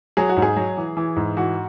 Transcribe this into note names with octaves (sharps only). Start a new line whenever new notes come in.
F#3 G#4
F#4
G#2
G#4
F#3
E3
E3
G#2
E3 F#4